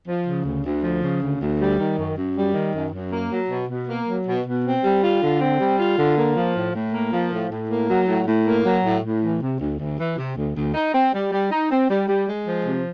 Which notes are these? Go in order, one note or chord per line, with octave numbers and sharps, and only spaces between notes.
F3
C#3
D2
D2
F3
C#3
D2
D2
G3
D#3
F#2
F#2
G3
D#3
F#2
F#2
A#3
F#3
B2
B2
A#3
F#3
B2
B2
C4
G3
F4
D3
C4
G3
F4
D3
A#3
F3
A2
A2
A#3
F3
A2
A2
A#3
F#3
A2
A2
A#3
F#3
A2
A2
E3
C3
D2
D2
E3
C3
D2
D2
D#4
C4
G3
G3
D#4
C4
G3
G3
G#3
F3
C3